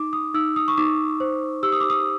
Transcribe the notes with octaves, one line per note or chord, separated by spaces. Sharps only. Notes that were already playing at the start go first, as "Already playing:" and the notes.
Already playing: D#4 D6
D#6
D#4 E6
D#6
C#6
D#4 D6
C5
G4 E6
D#6
D6
D#6